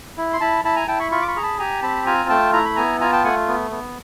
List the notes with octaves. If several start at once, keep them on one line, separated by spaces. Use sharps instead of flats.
E4
C6
E4 A5 B5
E4 A5 B5
G#5 A#5
E4 G5 A5
B5 C#6
F4 B5 C#6
D6
B5 C#6
G#4 A#5
A5 B5
G4 G#5 A#5
C4 A5 B5
F4 G#5 A#5
A3 G5 A5
E4 A#5
B5
B3 G#5 A#5
F4 G#5 A#5
G5 A5
A3 F#5 G#5
B3
B3